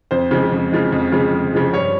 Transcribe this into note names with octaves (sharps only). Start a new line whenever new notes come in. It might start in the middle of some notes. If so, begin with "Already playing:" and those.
F2 C5
C#3 F3 G#3
F2
C#3 F3 G#3
F2
C#3 F3 G#3
F2
C#3 F3 G#3
G2 C#5